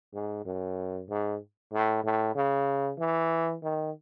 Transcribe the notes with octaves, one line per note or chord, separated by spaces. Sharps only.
G#2
F#2
G#2
A2
A2
C#3
E3
D#3